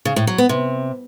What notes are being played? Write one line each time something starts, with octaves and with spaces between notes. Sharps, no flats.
C#3
A2
F#3
B3
C3